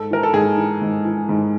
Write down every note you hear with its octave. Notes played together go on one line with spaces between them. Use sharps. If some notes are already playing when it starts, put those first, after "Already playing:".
Already playing: G#2 A4
E3 A#4
A4
G#2 G#4
E3
G#2
E3
G#2